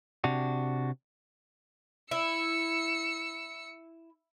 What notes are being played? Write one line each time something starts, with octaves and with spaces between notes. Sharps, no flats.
C3 D4 F#4
E4 E6 C#7